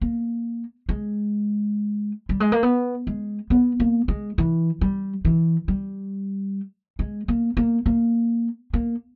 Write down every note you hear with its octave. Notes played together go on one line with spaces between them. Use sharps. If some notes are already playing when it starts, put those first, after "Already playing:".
A#3
G#3
G3
G#3
A#3
B3
G#3
B3
A#3
G#3
E3
G3
E3
G3
G#3
A#3
A#3
A#3
A#3